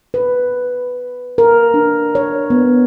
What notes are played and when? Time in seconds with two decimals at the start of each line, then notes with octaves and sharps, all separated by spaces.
0.14 B4
1.38 A#4
1.74 D4
2.15 C#5
2.50 B3